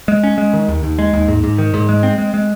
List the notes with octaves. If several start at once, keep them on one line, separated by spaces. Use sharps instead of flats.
G#3
C#4
G#3
D#3
D#2
D#2
G#3
D#2
G#2
G#2
D#3
G#2
G#3
C4
G#3
G#3